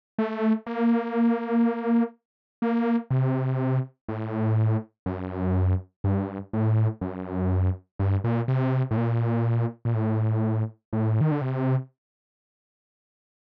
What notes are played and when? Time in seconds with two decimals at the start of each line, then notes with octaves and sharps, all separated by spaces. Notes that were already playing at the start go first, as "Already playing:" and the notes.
0.18 A3
0.66 A#3
2.62 A#3
3.10 C3
4.08 A2
5.06 F#2
6.04 G2
6.53 A2
7.01 F#2
7.99 G2
8.24 A#2
8.48 C3
8.91 A2
8.97 A#2
9.85 A#2
9.95 A2
10.93 A2
11.21 D#3
11.31 D3
11.41 C3